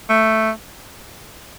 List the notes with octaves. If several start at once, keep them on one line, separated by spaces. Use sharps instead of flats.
A3